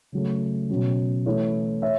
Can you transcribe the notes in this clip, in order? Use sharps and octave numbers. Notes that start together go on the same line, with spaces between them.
C#3 F#3 A3
B2 F#3 C#4
E3 A3 E4 C#5
C#5 E5